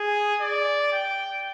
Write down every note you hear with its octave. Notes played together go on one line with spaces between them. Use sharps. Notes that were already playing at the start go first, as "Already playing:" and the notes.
Already playing: G#4
D5
G5